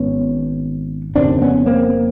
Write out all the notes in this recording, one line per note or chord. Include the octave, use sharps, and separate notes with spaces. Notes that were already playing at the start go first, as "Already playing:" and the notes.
Already playing: G#1 B3 C#4
F1 D#2 C#3 C4 D4
B3 C#4
A#3 C4